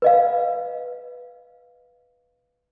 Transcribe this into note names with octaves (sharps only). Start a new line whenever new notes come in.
B4 D#5 F5